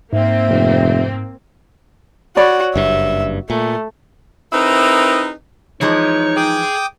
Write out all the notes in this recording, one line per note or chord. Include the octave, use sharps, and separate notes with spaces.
G#2 A#3 C4 E5
F1
F#4 C#5 D5 B5
F#1 G2 E5
A#2 A3
C4 D#4 E4 G#4 A#4 B4
E3 F3 G#3 D#4 C#5
G#4 G5 D6 D#6